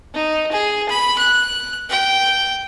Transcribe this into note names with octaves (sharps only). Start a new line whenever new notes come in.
D#4
G#4
B5
F#6
G5